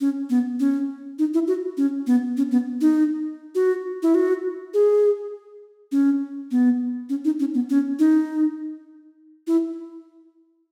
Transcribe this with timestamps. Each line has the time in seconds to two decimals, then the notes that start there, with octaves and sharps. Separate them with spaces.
0.01 C#4
0.30 B3
0.60 C#4
1.19 D#4
1.34 E4
1.48 F#4
1.77 C#4
2.07 B3
2.37 C#4
2.51 B3
2.81 D#4
3.55 F#4
4.03 E4
4.15 F#4
4.74 G#4
5.92 C#4
6.51 B3
7.09 C#4
7.25 D#4
7.40 C#4
7.54 B3
7.70 C#4
7.99 D#4
9.47 E4